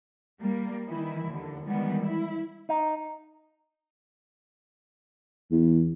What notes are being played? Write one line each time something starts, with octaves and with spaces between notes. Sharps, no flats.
G3 A#3
D#3 E3 E4
D#2 D3
D#3 E3 G3 G#3 B3
E4
D#4
E2